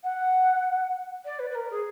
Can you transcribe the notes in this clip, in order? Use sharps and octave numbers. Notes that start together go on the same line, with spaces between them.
F#5
D5
B4
B4
A#4
G#4